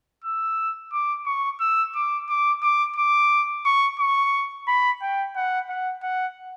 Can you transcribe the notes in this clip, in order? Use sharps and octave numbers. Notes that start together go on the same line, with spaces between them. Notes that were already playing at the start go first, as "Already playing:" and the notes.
E6
D6
C#6
E6
D6
D6
D6
D6
C#6
C#6
B5
G5
F#5
F#5
F#5